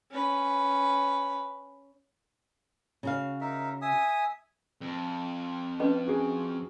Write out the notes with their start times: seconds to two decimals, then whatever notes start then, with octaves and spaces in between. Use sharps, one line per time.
0.11 C#4 B4
3.03 C#3 F#4 F5
3.41 D#4 A#4 E5
3.82 E5 G#5 D#6
4.81 F2
5.80 C#4 B4 D#5
6.07 F#4 G#4